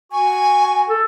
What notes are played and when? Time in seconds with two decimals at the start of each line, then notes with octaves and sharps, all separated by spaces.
0.12 F#4 G#5 C#6
0.89 A4